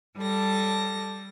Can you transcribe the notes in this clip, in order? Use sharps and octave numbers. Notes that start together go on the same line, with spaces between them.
G3 A4 A5 A#6